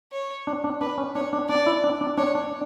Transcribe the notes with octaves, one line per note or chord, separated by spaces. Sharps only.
C#5
D4
D4
D4 B4
C#4
D4 C#5
D4
D4 D5
E4
D4
D4
D4 C#5
D4